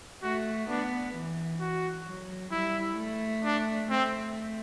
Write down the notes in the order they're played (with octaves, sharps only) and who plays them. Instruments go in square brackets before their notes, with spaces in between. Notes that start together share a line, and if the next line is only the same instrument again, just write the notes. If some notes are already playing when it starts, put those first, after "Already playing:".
[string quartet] A3 [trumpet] F#4
[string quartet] B3 [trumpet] D4
[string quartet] E3
[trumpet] F#4
[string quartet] F#3
[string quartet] G3 [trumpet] E4
[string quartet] A3
[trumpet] D4
[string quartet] A3 [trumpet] C4